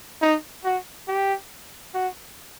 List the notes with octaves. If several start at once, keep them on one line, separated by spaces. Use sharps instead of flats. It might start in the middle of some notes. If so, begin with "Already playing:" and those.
D#4
F#4
G4
F#4